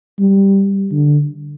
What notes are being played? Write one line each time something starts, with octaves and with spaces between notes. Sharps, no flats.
G3
D3